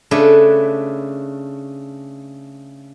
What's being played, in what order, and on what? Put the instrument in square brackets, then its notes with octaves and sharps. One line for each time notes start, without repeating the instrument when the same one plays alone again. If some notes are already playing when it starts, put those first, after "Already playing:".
[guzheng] C#3 A3 D4 B4